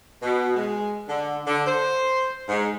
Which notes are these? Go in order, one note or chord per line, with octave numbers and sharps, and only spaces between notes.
B2
G#3
D3
D3
C5
G#2